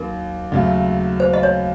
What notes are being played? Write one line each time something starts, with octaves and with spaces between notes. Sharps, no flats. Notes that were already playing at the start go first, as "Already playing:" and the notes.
Already playing: D#2 D#3 F#3 A#4
D#2 C#3 F#3 A3
C5
D#5
C#5